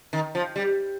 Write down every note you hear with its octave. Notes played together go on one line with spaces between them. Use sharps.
D#3
F3
G3